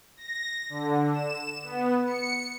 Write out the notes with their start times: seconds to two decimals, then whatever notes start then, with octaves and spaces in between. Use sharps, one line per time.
0.17 A#6
0.69 D3
1.13 E7
1.63 B3
2.05 C#7